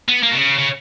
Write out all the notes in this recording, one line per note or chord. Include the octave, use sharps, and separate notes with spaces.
B3
A#3
B2
C#3
C#3